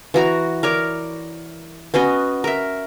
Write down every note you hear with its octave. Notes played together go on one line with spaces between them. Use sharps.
E3 F#4 A#5
A#4 C#5 D5
B3 C#4 F#4 D#5
A#4 E5